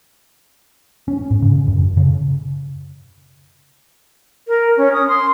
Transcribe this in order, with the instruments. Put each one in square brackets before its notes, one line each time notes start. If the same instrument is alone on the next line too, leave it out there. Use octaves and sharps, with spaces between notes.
[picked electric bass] C#4
G#2
C#3
F#2
C#3
[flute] A#4
C#4
D#6
C6